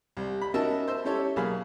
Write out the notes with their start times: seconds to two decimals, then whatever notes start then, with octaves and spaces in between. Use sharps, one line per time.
0.17 C2
0.41 B5
0.54 C#4 D#4 F#4 A#4 E5 A5
0.88 C5 E5
1.05 C#4 E4 G4 A4 C#5
1.36 B1 A#3 G#4 F5 B5